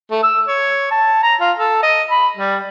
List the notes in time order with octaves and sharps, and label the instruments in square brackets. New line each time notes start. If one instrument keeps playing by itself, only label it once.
[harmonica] A3
E6
C#5
A5
A#5
F4
A4
D#5
B5
G3